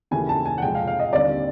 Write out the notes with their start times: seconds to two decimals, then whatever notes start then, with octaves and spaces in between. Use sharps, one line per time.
0.11 D#2 C#3 E3 A3 G#5
0.29 A5
0.46 G#5
0.58 F#5
0.62 F2 C3 F3 G#3 G5
0.75 F5
0.88 F5
1.00 D#5
1.13 D#2 D3 G3 C4 D5